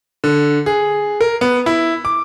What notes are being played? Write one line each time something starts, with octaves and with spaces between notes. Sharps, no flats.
D3
G#4
A#4
B3
E4
D6